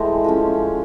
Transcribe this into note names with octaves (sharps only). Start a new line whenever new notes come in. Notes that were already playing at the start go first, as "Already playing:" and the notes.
Already playing: A2 E3 G#3 C5
F3 G#3 C#4